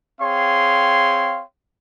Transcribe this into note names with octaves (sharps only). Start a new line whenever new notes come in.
C4 G#4 C#5 F5 G5 C6